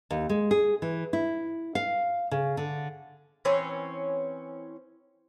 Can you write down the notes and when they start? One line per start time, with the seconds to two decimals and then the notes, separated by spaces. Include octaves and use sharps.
0.11 D#2
0.29 G#3
0.51 G#4
0.82 E3
1.13 E4
1.75 F5
2.31 C#3
2.57 D3
3.45 E3 C4 C#4 C#5